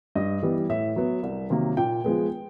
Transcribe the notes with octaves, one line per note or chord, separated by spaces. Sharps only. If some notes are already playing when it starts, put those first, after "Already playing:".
G2 D#5
E3 G3 B3
A2 E5
F#3 B3
C2
C3 D#3 F#3 A#3
A#2 G5
F3 G#3 B3